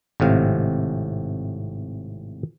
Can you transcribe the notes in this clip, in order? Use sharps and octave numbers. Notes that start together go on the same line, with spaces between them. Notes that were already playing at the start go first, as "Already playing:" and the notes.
G#1 A2 C3 F5